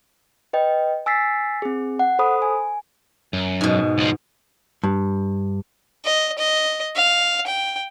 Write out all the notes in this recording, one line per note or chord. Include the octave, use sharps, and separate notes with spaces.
B4 D#5 G5
G#5 E6 A6 B6 C7
C4 G#4
F#5
A4 C5 B5 D#6
G#5
F#2
G#2 B2
C#2 F3
G2
D#5
D#5
F5
G5